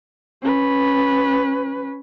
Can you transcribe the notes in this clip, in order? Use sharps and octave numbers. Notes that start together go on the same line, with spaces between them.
C#4 B4